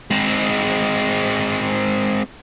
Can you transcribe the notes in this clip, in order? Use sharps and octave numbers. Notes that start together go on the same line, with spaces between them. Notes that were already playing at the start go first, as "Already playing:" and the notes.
G#3 C4